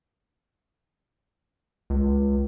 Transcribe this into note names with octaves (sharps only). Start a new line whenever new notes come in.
C#2